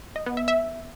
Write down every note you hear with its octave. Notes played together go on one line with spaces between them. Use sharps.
D#5
B3
E5
E5